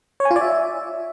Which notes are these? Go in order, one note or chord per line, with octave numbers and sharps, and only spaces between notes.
C#5
G#5
F4
D5
E5